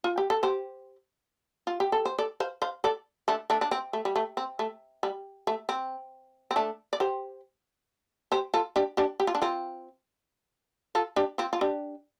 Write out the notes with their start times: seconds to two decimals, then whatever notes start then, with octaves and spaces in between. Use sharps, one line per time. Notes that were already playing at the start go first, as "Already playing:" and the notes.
0.04 F4
0.18 G4
0.30 A4
0.43 G4 C5
1.67 F4
1.80 G4
1.92 A4
2.05 C5
2.18 A4 D5
2.40 C5 F5
2.62 C5 F5
2.84 A4 D5
3.28 A3 D4
3.50 A3 D4
3.61 D4
3.71 C4
3.93 A3
4.05 G3
4.16 A3
4.37 C4
4.59 A3
5.03 G3
5.47 A3
5.69 C4
6.51 C4
6.56 A3 D4
6.93 D5
7.00 G4 C5
8.32 G4 C5
8.54 F4 A4
8.76 D4 G4
8.97 D4 G4
9.20 G4
9.27 F4
9.35 D4
9.42 C4 F4
10.95 F4 A4
11.16 D4 G4
11.38 C4 F4
11.53 F4
11.61 D4 G4